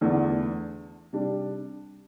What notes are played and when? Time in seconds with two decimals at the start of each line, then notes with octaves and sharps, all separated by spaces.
0.01 E2 D3 A3 D4
1.13 C3 G3 D4